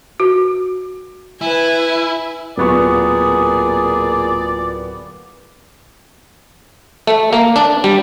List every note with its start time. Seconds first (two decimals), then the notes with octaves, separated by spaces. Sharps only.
0.20 F#4
1.41 E4 B4 G#5
2.57 D1 A#2 B3 G#4 D5 C#6
7.07 A3
7.33 A#3
7.56 D4
7.84 G3